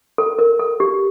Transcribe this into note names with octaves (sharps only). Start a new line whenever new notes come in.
A4
A#4
A4
G4